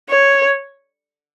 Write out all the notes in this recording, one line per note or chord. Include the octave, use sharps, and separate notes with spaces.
C#5